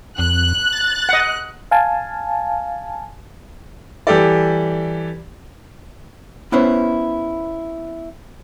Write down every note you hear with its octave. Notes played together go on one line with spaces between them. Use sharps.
F2 F#6
A6
D#5 F#5
F5 G#5 A5
E3 G3 G4 A4 D5
B3 C#4 E4 B4 C5